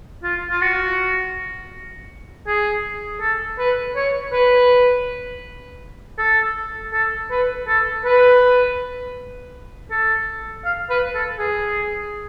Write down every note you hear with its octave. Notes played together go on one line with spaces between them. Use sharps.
F4
F4
F#4
G#4
A4
B4
C#5
B4
A4
A4
B4
A4
B4
A4
F5
B4
A4
G#4